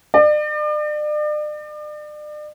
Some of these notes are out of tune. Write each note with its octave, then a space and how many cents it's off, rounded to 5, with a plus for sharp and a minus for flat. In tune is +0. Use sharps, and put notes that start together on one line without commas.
D5 +40